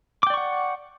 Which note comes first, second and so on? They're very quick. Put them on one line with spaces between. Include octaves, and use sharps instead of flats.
D6 G5 D5 C#6 F#5